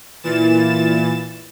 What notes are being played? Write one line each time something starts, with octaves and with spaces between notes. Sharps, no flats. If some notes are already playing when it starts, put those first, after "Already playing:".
A#2 E3 A6 E7